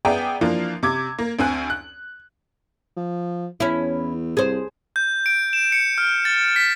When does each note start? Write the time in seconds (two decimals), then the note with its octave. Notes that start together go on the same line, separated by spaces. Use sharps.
0.05 B3 G#4 D5 E5 G5 A#5
0.41 E3 F3 A#3 D4 F4
0.83 C3 D6 G#6
1.19 A#3
1.39 D2 C4 G#5 F#6
1.70 F#6
2.96 F3
3.60 E2 C#4 E4
4.37 C2 G#4 C5
4.96 G6
5.26 D7
5.53 E7
5.72 C#7
5.98 F6
6.25 A6
6.56 B6